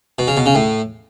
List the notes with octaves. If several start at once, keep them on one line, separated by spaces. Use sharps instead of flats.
B2
C#3
B2
C#3
A2